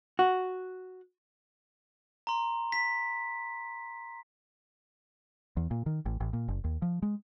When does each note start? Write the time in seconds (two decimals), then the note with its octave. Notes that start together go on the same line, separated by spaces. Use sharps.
0.19 F#4
2.27 A#5 C6
2.72 B6
5.57 E2
5.71 A#2
5.86 D#3
6.06 A1
6.20 A1
6.33 A#2
6.48 F#1
6.64 D#2
6.82 F3
7.02 G#3